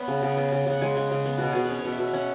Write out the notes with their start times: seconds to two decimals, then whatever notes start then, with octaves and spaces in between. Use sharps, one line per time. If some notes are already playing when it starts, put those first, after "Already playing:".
Already playing: B3 C#4 E5 B5
0.08 C#3
0.23 C#3
0.37 B3
0.52 C#3
0.66 C#3 F#5
0.81 G#3 G#5
0.96 C#3
1.11 C#3
1.26 B3
1.38 B2 F#4
1.52 B2 G#4
1.65 C#4 B4
1.79 C#5
1.85 B2
1.92 E5
1.99 B2
2.07 E5
2.13 C#4 F#5